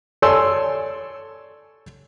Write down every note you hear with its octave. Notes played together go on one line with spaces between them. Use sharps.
A4 C#5 D5 G#5 C6 E6